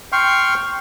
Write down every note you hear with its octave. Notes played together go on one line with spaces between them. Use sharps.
G5 C6 C#6 F6